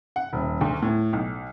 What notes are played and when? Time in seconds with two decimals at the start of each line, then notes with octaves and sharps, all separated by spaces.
0.16 F#5
0.33 D#1
0.61 D2
0.82 A2
1.13 B1